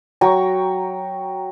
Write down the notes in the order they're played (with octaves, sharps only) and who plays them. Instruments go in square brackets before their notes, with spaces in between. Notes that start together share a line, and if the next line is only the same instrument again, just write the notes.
[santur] F#3 G5 A#5 C#6